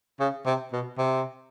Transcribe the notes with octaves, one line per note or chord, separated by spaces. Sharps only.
C#3
C3
B2
C3